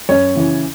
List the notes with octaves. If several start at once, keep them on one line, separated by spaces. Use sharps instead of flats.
F#2 C#5
C#3 E3